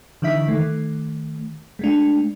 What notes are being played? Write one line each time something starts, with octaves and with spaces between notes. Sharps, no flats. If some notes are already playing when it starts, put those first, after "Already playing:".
D3 E3 D#4 E5 B6
D#3 A3
G#3 A3 D4